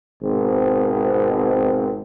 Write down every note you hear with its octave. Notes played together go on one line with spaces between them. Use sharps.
G#1 B2 C4